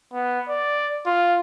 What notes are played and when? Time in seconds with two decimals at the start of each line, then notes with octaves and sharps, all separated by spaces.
0.13 B3
0.48 D5
1.06 F4